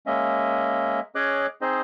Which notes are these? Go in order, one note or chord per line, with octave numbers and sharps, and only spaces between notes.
G#3 A#3 C#4 D#5 E5
C#4 G#4 C#5 D#5 D6 F#6
C4 D#4 G#4 C5 D#5